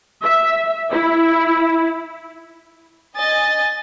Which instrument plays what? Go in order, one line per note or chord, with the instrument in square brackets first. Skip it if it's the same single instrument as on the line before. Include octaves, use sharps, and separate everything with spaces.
[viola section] E5
E4
[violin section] D#5 G#5 A6